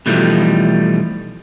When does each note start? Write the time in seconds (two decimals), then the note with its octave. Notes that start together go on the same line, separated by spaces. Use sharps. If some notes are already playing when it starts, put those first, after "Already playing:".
0.06 B2 E3 F3 G3 A3 D#4